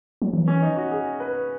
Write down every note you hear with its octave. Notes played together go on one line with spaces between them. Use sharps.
F#3
E3
C#4
D#4
F#4
G#4
B4